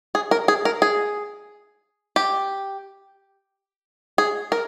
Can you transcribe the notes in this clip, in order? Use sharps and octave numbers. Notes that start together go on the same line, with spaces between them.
G#4
A#4
G#4
A#4
G#4
G4
G#4
A#4